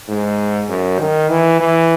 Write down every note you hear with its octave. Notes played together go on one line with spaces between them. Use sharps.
G#2
F#2
D#3
E3
E3